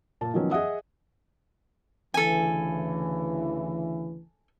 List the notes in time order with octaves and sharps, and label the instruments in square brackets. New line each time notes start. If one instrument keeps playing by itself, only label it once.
[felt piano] A#2 A5
D#3 F3 F#3 B3 C#4
G#4 D#5 E5 F#5 D#6
[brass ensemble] D2 C#3 E3 [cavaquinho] A4 G#5